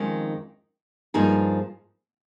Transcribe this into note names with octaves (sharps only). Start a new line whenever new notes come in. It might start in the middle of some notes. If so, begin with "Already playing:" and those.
Already playing: F2 D#3 G#3 C#4
G2 F3 A#3 D#4 G#4